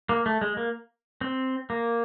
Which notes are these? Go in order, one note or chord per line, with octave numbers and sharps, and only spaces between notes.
A#3
A3
G#3
A#3
C4
A#3